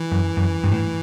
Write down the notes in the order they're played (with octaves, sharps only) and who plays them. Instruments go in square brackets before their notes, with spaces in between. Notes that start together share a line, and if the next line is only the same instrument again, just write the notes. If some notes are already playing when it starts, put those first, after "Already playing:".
Already playing: [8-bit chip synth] E3
[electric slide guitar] F#2
F#2
G2
A2